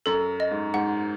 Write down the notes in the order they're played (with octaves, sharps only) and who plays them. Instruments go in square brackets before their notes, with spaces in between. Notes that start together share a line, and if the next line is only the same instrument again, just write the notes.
[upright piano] F#2 [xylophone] A4
[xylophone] D#5
[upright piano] G#2
[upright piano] G#2 [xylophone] F#5